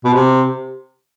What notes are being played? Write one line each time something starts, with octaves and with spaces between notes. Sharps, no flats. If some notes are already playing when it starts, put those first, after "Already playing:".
B2
C3